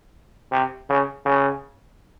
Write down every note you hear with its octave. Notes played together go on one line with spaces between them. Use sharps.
C3
C#3
C#3